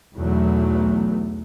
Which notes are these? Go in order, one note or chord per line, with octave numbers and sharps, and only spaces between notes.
B1 E2 F#3 A3